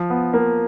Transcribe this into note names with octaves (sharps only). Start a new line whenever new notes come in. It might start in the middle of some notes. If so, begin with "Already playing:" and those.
Already playing: F3
B3
A#3